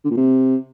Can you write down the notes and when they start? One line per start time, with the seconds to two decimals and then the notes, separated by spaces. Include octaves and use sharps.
0.05 D3
0.11 A#2
0.17 C3